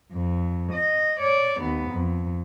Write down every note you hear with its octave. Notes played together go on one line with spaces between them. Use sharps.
F2
D#5
C#5 D5
D#2 B3
F2